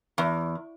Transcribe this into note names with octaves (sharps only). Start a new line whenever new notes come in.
E2